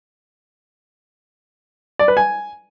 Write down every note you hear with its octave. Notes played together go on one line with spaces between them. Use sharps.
D5
B4
G#5